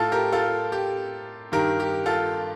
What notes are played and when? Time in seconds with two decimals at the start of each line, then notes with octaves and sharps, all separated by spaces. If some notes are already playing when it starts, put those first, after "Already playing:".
Already playing: A2 F4 A4
0.12 G4 A#4
0.32 F4 A4
0.72 G4
1.52 G2 D#3 G4 A#4
1.80 G4
2.06 F4 A4